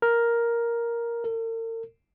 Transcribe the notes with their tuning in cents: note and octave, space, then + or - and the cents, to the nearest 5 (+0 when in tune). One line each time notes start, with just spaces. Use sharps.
A#4 +5
A#4 -45